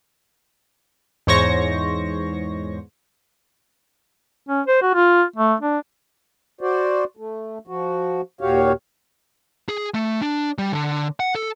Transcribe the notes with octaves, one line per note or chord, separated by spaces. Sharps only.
E2 G#2 C5 C#5 C#6 A#6
C#4
C5
F#4
F4
A3
D4
F#4 C5 D5
A3
F3 F#4
D#2 A#2 F#4 G4 C#5 F5
G#4
A3
D4
G3
D3
F#5
A4